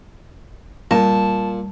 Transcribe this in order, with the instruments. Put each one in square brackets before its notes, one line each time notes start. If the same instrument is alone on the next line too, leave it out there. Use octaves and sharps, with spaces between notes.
[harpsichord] A#2 [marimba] G3 [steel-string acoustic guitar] A5